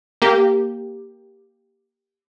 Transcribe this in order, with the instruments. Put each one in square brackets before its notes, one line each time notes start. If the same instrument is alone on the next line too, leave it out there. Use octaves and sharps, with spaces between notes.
[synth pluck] A#3 G4